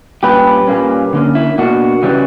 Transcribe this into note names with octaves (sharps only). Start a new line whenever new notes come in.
A#2 G3 C#4 G4 B4
A#2 G3 A#3 C#4
D3 A#3 C#4
E4
B2 A#3 D4 F#4
C#3 E3 G3 C#4